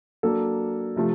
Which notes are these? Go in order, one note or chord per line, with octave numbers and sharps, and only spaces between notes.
F#3 A#3 D4 A4
C3 F3 A3